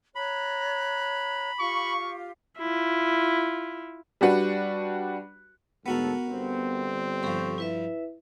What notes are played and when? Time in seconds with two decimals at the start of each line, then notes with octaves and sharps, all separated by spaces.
0.15 C#5 A#5 B5 F#6
1.59 F4 G4 F5 C#6
2.58 E4 F4
4.21 G3 D4 F#4 B4
5.86 D2 G#2 B3 F#4 A4 A#4
6.27 G1 C4
7.23 G2 F3 G4 A4 C#6
7.58 E4 B4 E5